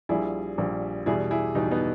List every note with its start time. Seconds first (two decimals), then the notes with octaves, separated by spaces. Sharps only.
0.09 A#1 A#2 G3 E4 G#4
0.58 A#1 A#2 G3
1.06 E2 B2 G3 E4 G#4
1.31 E4 G#4
1.55 E2 B2 G3 D#4 G4
1.71 B3 D#4